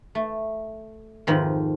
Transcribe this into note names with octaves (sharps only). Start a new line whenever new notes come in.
A3
F2 G#2 D#3 F3